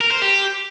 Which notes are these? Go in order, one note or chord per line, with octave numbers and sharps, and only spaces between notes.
A#4
C5
G4